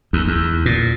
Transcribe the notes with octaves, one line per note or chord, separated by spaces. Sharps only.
D#2
E2
A#2